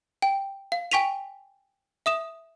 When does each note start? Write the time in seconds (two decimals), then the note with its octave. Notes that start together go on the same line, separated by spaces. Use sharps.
0.22 G5
0.72 F5
0.91 G5 G#5 C#6 B6 D#7 F7
2.06 E5 D#6 E7